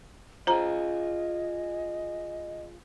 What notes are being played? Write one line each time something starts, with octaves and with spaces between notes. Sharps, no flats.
F4 G#4 C5 D#5 A#5